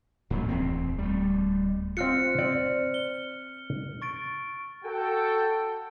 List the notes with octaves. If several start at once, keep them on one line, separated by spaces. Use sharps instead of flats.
D1 F2 A#2 F3
E2 C4
G3 A3
C4 F4 F6 F#6 C#7
C4 C5 D5
G7
C#6 A6 D7
F#4 A4 G5